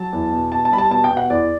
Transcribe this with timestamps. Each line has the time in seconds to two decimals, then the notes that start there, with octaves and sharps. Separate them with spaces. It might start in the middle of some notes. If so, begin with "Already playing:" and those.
Already playing: F#3 A5
0.13 E2
0.33 B2
0.52 B2 A5
0.65 A5
0.71 G3 B5
0.78 A5
0.91 B2 A5
1.04 G5
1.11 B2
1.17 F#5
1.30 E2 D5